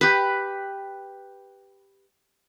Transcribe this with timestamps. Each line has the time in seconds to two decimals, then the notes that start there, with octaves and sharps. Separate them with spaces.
0.01 G4 B4